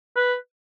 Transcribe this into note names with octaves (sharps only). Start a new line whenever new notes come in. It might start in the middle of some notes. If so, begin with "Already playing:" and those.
B4